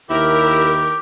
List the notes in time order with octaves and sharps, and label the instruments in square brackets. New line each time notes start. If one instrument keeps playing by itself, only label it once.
[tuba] D#2 [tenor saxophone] E4 [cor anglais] G4 [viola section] A#4